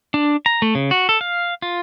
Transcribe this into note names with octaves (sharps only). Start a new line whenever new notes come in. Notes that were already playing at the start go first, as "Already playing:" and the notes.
D4
A#5
A3
C#3
F#4
A4
F5
F4